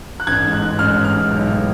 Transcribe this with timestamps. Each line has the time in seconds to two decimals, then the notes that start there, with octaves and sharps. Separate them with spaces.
0.20 F#6
0.27 A1 G#6
0.44 G#2
0.53 F#6
0.62 G#2
0.79 A1 F6
0.96 A1
1.05 F6
1.14 G#2
1.31 B1
1.48 A2